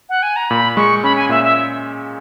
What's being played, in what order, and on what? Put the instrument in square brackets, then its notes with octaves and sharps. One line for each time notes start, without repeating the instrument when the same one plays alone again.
[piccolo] F#5
G#5
A#5
[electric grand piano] A#2 [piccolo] B5
[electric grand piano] G#3 [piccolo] C#6
[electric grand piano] C#4 [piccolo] B5
[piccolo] G#5
[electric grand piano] A#2 [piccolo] E5
[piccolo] E5